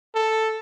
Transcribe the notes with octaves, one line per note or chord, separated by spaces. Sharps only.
A4